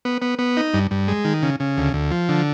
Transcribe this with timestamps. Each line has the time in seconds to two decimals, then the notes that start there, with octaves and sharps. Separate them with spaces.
0.05 B3
0.22 B3
0.39 B3
0.57 D#4
0.74 G2
0.91 G2
1.08 G#3
1.25 D#3
1.43 C#3
1.60 C#3
1.78 D2
1.94 D2
2.11 F3
2.29 D3